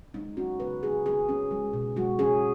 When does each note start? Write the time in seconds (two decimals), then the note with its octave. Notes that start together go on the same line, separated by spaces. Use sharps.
0.14 G#3 D#4
0.37 C#4 F#4
0.60 C#3 B4
0.83 C#3 G#4
1.06 C#3 G#4
1.29 C#4
1.51 G#3
1.73 B2
1.96 G#3 F#4
2.19 C#4 G#4